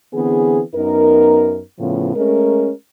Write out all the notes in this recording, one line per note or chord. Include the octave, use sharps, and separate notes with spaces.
D3 E3 B3 C4 G#4
F#2 B3 D#4 A#4
A2 C#3 F3 B3 F4
G#3 A3 C#4 A#4